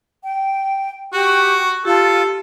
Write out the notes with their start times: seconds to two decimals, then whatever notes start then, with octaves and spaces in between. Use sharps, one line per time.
0.24 G5
1.13 F#4 G4 C#6
1.85 F4 G4 A4 A5